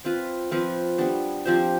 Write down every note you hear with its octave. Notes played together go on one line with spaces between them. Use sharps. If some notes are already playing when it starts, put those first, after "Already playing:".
C4 F4 B4
F3 C4 F4 B4
G3 B3 D4
F3 C4 G4 C5